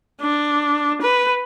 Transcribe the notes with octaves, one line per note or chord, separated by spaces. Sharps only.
D4
B4